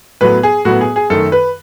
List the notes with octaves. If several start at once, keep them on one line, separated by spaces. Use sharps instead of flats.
A2 F#3 B3 B4
G#4
A2 F#3 B3 F#4
G#4
G#4
F#2 D#3 A3 A4
B4